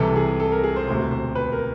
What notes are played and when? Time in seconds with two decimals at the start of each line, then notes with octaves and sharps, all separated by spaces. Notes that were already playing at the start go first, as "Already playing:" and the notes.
Already playing: C2 C3 E3 A4
0.16 G#4
0.40 A4
0.52 A#4
0.64 G#4
0.76 C5
0.87 E1 D2 C3 C5
1.11 C5
1.35 B4
1.52 A#4